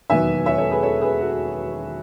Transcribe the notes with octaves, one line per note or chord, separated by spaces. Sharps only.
E1 D#2 D#3 F#3 B3 E5 G#5
C#5 E5
A4 C#5
G#4 B4
A4 C#5
G#4 B4
F#4 A4